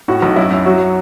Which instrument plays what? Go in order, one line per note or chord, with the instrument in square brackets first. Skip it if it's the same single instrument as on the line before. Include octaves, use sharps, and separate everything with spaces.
[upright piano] A2 F#4
B1
F#2 E4
F#2
F#3 F#4